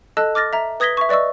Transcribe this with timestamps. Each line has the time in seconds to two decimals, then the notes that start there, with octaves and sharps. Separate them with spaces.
0.17 A4 D#5 A5 E6 F#6
0.35 D6 F6 A6 A#6
0.53 E5 A#5
0.80 B4 D#6 G#6 A#6 B6 G7
0.97 E5 C#6
1.09 B4 D5 D#5 C#6 E6